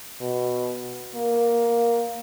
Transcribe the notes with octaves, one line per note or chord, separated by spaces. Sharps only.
B2
A#3